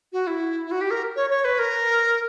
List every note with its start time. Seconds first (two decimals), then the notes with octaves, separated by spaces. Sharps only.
0.13 F#4
0.27 E4
0.66 E4
0.71 F#4
0.81 G4
0.91 A#4
1.16 C#5
1.30 C#5
1.45 B4
1.59 A#4